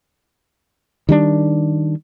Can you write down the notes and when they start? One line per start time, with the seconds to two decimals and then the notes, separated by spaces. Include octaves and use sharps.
1.09 D#3 G3 D4